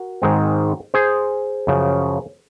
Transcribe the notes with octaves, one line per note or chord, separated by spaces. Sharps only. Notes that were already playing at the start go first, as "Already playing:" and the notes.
Already playing: F#4 A#4
G#2 D#3 G#3 C4
G#4 C5
F#2 C#3 F3